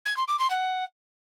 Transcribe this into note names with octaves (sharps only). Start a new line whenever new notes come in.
G#6
C6
D6
C6
F#5